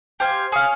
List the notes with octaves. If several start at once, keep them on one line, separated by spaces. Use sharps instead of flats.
G4 C5 F5 G#5
G#4 C#5 F5